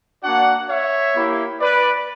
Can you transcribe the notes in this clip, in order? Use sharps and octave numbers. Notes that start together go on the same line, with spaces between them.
A#3 D4 F#4 D5 F#5
C#5 E5
A#3 E4 G4
B4 D5